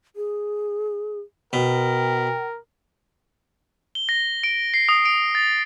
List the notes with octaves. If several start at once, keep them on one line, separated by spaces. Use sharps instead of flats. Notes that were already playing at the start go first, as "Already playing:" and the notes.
G#4
B2 A#4 G5
G7
A#6
D7
C7
D#6
D7
A6